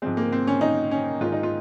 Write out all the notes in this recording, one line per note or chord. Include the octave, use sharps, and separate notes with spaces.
G#2 F3 G#3 C4
A#3
C4
C#4
D#4
C#4
G#2 D#3 G#3 F4
D#4
F4